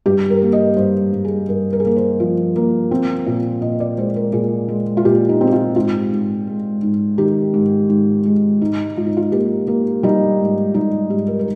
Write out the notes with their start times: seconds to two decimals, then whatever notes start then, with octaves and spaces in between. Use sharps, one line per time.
0.06 G2 G4
0.30 A#4
0.42 A#3
0.53 D#5
0.77 G2 C5
1.13 G2
1.25 G#4
1.49 G2 A#4
1.73 A#4
1.80 G#4
1.85 A#3 A#4
1.96 C5
2.20 F3
2.56 A#3
2.91 C4
3.26 A#2
3.62 A#2 D#5
3.80 D5
3.97 G#3 C5
4.16 A#4
4.33 A#2 G#4
4.68 G#3
4.97 F4
5.05 A#2 G4
5.29 D#4
5.41 C4
5.47 G4
5.52 F4
5.76 G#2 F4
6.12 G#2
6.47 G#3
6.83 G#2
7.18 D#3 G4
7.54 G#2
7.89 G#2
8.25 G#3
8.61 G#2 D#4
8.97 G#2 F4
9.07 D#4
9.17 F4
9.32 A#3 G4
9.68 A#3
10.03 G3 D#4
10.40 G#2
10.74 G3 D#4
11.10 G#2 G4
11.28 A#4
11.39 A#4